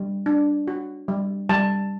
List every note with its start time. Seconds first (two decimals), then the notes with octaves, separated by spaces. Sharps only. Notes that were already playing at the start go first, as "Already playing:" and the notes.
Already playing: G3
0.26 D4
0.68 F#4
1.08 G3
1.49 G3 A5